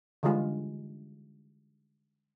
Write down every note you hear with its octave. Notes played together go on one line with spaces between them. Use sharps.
D3 E3 G3 G#3 F4